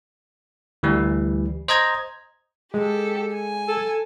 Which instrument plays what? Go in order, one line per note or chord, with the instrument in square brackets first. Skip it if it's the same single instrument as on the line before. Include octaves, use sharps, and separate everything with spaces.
[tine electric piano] D2 E3 G3
C5 D#5 A#5 G#6
[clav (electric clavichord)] G#3 [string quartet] G4 A4
[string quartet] G#5
[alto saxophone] A4